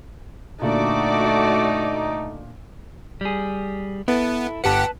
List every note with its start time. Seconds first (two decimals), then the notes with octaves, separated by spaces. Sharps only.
0.62 A#2 D3 A3 D#4 F#4 D5 D6
3.21 G3 G#4
4.08 B3 E4 A4
4.64 G1 G4 B4 F#5 A5